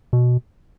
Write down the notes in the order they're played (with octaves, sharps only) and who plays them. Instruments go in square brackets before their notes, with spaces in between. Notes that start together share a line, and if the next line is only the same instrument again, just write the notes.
[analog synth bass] B2